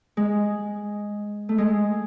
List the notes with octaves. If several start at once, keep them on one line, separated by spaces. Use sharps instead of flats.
G#3
A3
G#3